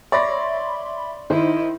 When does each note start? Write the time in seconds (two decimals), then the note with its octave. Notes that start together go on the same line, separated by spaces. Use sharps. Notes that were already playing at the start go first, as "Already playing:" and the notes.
0.12 C#5 D5 E5 B5 C6 A#6
1.30 D#3 D#4 E4 C5 D#5